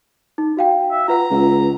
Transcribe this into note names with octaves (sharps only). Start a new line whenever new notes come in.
D#4
F#4 F5 G5
E5
F4 B4 F#5 A#5
C#2